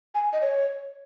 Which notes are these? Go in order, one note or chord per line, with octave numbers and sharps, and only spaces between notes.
G#5
D#5
C#5